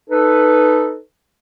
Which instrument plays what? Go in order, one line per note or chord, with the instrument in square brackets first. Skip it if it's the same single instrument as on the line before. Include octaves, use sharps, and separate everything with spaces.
[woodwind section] D#4 A4 B4